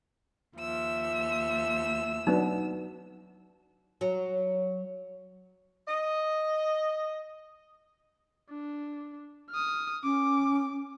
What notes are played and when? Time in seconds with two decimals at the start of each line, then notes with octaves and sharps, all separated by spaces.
0.56 D#2 F3 E5 E6
2.27 F#3 B3 D4 D#4
4.01 F#3
5.88 D#5
8.49 D4
9.50 D#6 F6
10.04 C#4 D6